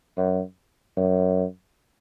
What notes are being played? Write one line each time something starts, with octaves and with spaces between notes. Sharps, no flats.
F#2
F#2